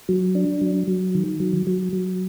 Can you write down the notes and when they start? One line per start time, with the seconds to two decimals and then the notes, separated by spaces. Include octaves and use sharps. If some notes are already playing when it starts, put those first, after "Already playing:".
0.09 F#3
0.35 D4
0.61 F#3
0.87 F#3
1.15 D#3
1.40 F#3
1.67 F#3
1.93 F#3